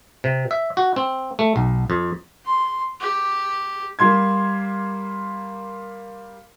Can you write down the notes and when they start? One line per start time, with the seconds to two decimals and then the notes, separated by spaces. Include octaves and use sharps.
0.24 C3
0.51 E5
0.77 F#4
0.96 C4
1.39 A3
1.56 B1
1.90 F2
2.45 C6
3.00 G4
3.99 G3 A#3 C6 G#6